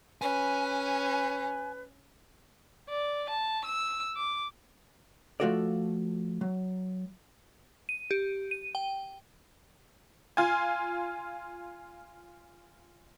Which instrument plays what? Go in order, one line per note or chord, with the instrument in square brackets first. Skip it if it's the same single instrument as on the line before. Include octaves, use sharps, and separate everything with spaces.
[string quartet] C#4 [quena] B4 [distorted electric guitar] G#5
[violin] D5
A5
E6
D6
[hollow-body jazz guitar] F3 A3 F4 F#4 A4 D5
F#3
[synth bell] D#7
G4
D#7
G5
[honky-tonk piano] F4 G#5